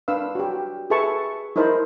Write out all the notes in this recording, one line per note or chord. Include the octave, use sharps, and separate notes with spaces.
D4 B4 F5 E6
F#4 G4
G#4 A4 B4 E5 A5 C#6
D#4 E4 A#4 C5 A5 B5